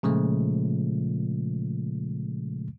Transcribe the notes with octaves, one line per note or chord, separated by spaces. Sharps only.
A#2 C#3 F3 G#3 A3